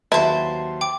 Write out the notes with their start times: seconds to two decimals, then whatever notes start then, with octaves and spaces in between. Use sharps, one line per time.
0.12 D#2 F#3 E4 G4 B4 C5 A5
0.81 G5 D6